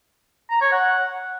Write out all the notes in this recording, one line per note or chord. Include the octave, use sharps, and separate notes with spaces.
A#5
C#5
F#5